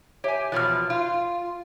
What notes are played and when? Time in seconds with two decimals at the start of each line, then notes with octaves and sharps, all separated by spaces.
0.24 G4 C#5 E5 G#5
0.52 E2 B2 F3 F6 F#6
0.90 F4